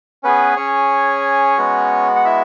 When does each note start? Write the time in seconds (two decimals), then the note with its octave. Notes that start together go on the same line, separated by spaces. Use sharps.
0.23 B3 C#4 G#4 B4
0.57 C#4 C#5
1.58 G#3 B3 F#4
2.16 F#5
2.25 E4 E5